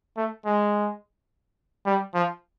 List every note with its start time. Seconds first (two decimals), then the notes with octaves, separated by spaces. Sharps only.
0.17 A3
0.46 G#3
1.86 G3
2.14 F3